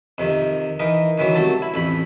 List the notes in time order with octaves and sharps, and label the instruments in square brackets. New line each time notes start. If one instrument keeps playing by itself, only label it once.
[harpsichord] F2 C3 D#3
E3 D#4 A#4
C#2 D#3 E3 F#3
C2 F#3 A3 A5
E4
A1 F2 B5